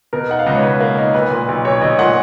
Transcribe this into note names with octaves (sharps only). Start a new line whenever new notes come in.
B2 A#4
D#4 F#5
F5
C#2 D#5
C#5
C#2 B4
A#3
D#4
B1 B4
A#2
B1
B1 C#5
B1 D#5
A#2 F#5